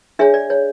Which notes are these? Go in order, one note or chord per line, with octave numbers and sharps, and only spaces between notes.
D4 G#4 C#5 E5
D5
C#5